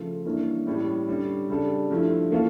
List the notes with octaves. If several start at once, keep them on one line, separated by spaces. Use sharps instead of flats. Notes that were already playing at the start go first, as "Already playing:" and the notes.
Already playing: C#3 F3 A3
G2 E3 A#3 C#4 E4
A2 G3 C#4
D3 G3 C#4
C#3 G3 D4 A4
G2 F3 A3 E4
E3 A#3 C#4 F4 A4